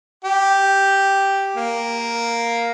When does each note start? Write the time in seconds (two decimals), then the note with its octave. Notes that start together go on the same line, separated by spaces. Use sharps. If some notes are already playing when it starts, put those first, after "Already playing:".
0.24 G4
1.56 A#3